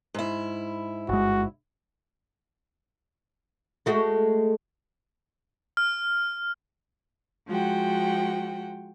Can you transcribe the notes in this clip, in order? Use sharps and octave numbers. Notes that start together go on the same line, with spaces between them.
G#2 E4
G1 G#3 F#4
G#3 A3 F#4
F6
F3 G#3 F#4 F#5 G5